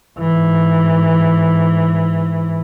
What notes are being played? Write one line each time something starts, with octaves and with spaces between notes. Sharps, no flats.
G#2 E3